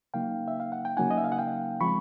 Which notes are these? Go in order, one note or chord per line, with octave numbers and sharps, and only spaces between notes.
C#3 F#3 A#3 D#4 F5 G5
E5
F5
F#5
G5
C#3 F#3 A#3 D#4 F#5 G#5
D#5
E5
F5
F#5
F5 G5
F3 G#3 C4 B5 C#6